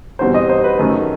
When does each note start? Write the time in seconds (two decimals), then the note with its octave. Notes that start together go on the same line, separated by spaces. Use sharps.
0.19 E2 B2 G3 C4 C5
0.34 D#5
0.49 C5
0.64 B4
0.79 F#2 D#3 A3